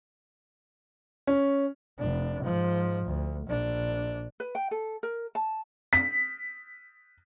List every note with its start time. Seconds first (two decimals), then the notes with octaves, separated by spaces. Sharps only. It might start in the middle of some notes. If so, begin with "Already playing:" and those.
1.27 C#4
1.99 F1 D4
2.43 G#2 F3
3.05 D2
3.47 A#1 D4
4.40 B4
4.55 G5
4.71 A4
5.03 A#4
5.35 A5
5.93 B6